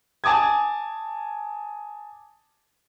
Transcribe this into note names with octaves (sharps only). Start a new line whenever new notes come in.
G#5 A5 D6 D#6 G#6